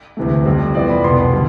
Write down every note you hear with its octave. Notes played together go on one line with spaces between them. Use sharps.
D2 C3 E3 A3
F2 C3 G3
F2 E3 B3 D5
B5
C2 B2 B3 C6
D3 G3